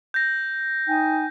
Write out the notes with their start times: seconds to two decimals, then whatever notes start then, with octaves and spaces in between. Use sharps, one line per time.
0.14 G6 A#6
0.87 D#4 G5 G#5